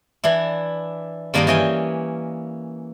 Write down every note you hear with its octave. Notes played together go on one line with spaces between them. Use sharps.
E3 D4 E4
G2 D#3 A#3 D4 B4 D#5
E3 C#4 D#5 G5 G#5